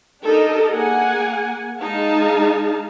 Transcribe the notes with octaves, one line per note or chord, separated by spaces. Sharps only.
D4 D#4 G4 A4 A#4 D#5
A#3 G#4 F#5 G#5
G#3 D#4 G#4 F5 A5